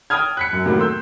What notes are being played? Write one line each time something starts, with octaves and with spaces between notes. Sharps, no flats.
G5 A5 D#6 F6 G#6
F#6 B6 C#7
F#2
A2 C3 D#3 F#3 A3 A#3
C6 E6 G6